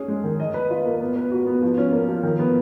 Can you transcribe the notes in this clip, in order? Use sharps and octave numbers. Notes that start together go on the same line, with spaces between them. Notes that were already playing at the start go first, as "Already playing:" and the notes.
Already playing: C#4 G#4
G#3
D#3
D#5
B4
F4
A#3
B3
B4
F#4
B3
F3
C#4
A#3
F3
D#3
B3